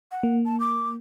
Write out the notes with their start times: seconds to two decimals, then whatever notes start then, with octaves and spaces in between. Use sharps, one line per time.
0.11 F#5
0.23 A#3
0.46 A5
0.60 D6